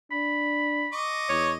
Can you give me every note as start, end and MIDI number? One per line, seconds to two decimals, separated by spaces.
0.11 0.87 62
0.11 1.00 83
0.93 1.57 75
0.93 1.57 85
0.93 1.57 86
1.29 1.57 40
1.29 1.52 73